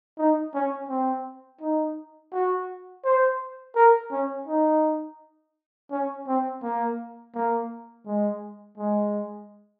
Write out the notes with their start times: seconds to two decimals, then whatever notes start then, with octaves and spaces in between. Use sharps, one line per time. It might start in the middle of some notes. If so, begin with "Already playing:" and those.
0.18 D#4
0.54 C#4
0.89 C4
1.61 D#4
2.33 F#4
3.05 C5
3.76 A#4
4.12 C#4
4.48 D#4
5.91 C#4
6.27 C4
6.63 A#3
7.35 A#3
8.06 G#3
8.78 G#3